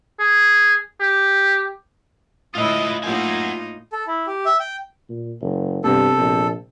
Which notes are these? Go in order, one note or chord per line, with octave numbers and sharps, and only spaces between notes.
G#4
G4
A2 E4 F4 B4 D#5
A2 A#3 D#4 F4 F#4 G#5
A4
E4
G4
E5
G5
A#2
F#1
G2 C3 B3 C4 A4
A#1